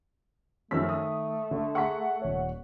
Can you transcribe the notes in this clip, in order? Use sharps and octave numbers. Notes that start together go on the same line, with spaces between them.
F#2 D#3 F3 A3 E6 B6
D#6
D3
G#4 F#5 A#5 C6 C#6 B6
D#1 C#5